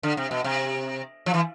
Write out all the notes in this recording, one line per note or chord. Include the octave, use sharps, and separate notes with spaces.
D3
C3
B2
C3
F3
E3